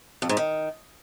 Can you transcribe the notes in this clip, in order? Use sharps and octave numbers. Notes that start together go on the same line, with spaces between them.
F2
G#2
D#3